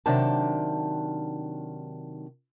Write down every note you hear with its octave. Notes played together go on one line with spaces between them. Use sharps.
C3 D#3 F#3 D4 G5 A5